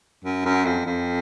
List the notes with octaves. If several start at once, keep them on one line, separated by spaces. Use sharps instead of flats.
F#2
F#2
F2
F2